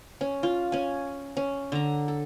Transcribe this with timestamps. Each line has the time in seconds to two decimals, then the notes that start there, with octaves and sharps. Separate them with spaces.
0.21 C#4
0.43 F4
0.72 C#4 G#5
1.37 C#4
1.72 D3 A#5
2.08 A4